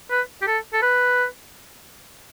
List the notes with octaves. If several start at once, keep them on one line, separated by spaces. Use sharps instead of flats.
B4
G4
A4
A4
B4